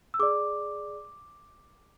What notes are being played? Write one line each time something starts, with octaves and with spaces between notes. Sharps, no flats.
E6
G#4 D5 D6